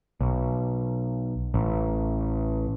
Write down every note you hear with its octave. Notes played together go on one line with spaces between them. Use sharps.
B1
A1